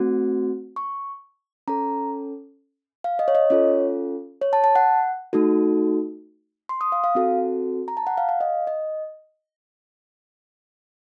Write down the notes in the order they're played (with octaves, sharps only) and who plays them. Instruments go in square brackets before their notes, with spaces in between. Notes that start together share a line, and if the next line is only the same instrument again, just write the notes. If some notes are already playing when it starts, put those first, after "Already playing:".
Already playing: [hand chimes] A3 C4 F#4
C#6
C#4 A4 A#5
F5
D#5
C#5
D#5
C#4 F4 A4 C#5
C#5
A5
A5
F#5
A3 D#4 F#4 A4
C6
D#6
F5
F5
C4 F#4 A4
A#5
A5
F#5
F5
F5
D#5
D#5